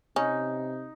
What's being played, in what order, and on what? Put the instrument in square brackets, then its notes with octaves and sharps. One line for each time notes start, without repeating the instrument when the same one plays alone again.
[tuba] C3 [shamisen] C#4 [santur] D#4